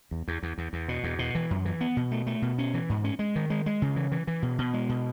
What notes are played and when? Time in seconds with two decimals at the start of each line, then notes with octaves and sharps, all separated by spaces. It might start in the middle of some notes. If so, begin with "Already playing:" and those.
0.11 E2
0.28 E2
0.43 E2
0.58 E2
0.73 E2
0.88 B2
1.03 E2
1.19 B2
1.35 E3
1.51 F#2
1.65 E3
1.81 B3
1.97 B2
2.11 A3
2.27 A3
2.42 B2
2.58 C#4
2.74 E3
2.89 G#2
3.04 C#4
3.19 G#3
3.36 D#3
3.50 G#3
3.66 G#3
3.82 C#3
3.96 E3
4.12 E3
4.27 E3
4.42 B2
4.58 B2
4.74 G#3
4.89 B2